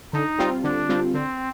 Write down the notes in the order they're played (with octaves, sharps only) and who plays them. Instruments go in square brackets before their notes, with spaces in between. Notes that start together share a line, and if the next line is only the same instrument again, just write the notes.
[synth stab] D3 [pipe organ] D#4
[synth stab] G3 C4 F4
[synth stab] D3 [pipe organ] D4
[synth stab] G3 C4 F4
[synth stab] D3 [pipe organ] C4